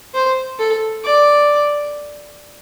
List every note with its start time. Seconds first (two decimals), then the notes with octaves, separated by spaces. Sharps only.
0.14 C5
0.59 A4
1.04 D5